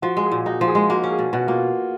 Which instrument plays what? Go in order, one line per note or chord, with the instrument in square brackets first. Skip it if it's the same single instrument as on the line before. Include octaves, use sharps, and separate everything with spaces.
[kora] F3 [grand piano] F#4
[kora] G#3
[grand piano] G#4
[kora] A#2
[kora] D#4 [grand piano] F#4
[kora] F3
[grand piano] G#4
[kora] G#3
[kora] A#3 [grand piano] F#4
[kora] C#4
[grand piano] G#4
[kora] B2
[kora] B2 [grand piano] F#4
[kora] A#3 [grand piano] F4